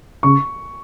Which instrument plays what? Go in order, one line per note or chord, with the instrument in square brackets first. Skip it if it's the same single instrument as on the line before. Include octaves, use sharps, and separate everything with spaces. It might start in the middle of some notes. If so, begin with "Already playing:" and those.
[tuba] C#3 [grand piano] C#6